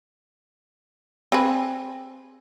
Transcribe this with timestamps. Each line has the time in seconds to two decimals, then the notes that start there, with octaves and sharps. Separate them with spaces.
1.32 C4 G#4 B4